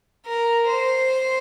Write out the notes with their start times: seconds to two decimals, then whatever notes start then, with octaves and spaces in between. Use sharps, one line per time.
0.26 A#4
0.67 C5